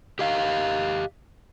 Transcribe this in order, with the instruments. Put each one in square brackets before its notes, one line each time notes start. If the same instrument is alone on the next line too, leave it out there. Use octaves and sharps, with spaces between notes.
[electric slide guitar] G4 D#5 F5